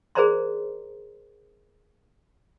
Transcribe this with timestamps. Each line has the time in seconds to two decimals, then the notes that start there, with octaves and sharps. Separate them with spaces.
0.15 G#4 A#4 C5 D5 A#5 C6